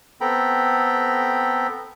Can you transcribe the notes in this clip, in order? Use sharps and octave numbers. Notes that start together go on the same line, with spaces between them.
B3 C4 A4 G5 A#5 B5